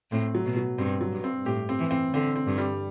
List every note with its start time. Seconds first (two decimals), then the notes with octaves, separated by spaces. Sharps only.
0.11 A2 C4
0.35 F#3
0.45 B2
0.56 F#3
0.78 G2 C4
1.01 F#3
1.13 G2
1.24 C4
1.45 A2 G4
1.69 C4
1.79 E3
1.91 C4
2.14 D3 C4
2.36 C4
2.47 G2
2.58 G3